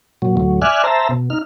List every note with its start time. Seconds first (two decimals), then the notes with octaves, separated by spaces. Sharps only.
0.22 A#2 F#3
0.37 D2 A2 F#3
0.62 D5 E5 G#5 F6 F#6
0.84 C5 E5 A5 A#5
1.09 B2
1.30 D#4 F6